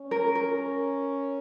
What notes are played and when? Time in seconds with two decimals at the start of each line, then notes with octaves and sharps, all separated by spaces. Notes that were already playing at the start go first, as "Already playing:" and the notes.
Already playing: C#4
0.11 A#4
0.35 A#4